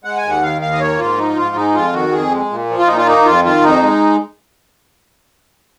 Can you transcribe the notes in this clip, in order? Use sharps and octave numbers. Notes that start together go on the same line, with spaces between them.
G#3 F#5
G#5
D#2
F#5
D#3 F5
D#2 F5
D#5
A#3 C#5
G#2 F4
F3 D#4
G#2 F4
G#3 D#4
F2 F4
D#3 F#4
F2 G#4
G#3
A#2
F3
F4
A#2 D#4
F4
A#3 D#4
F2 F4
D#3 F4
F2 D#4
G#3